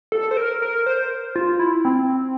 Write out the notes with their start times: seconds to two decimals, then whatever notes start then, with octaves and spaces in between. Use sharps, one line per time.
0.12 A4
0.31 C5
0.37 A#4
0.62 A#4
0.86 C5
1.36 F4
1.59 E4
1.85 C4